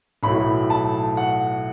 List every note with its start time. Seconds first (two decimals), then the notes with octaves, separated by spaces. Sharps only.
0.23 B1 A2 F#3 A3 B5
0.70 A5
1.17 F#5